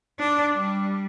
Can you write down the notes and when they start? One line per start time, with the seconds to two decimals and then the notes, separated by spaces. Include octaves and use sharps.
0.20 D4
0.55 G3